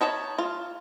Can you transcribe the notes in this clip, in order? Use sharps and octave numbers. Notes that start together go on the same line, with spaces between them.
D#4 C#5 A5 B5
F4